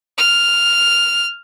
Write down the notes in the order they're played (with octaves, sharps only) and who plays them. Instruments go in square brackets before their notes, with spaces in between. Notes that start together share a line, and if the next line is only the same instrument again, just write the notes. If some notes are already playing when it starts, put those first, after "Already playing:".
[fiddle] F6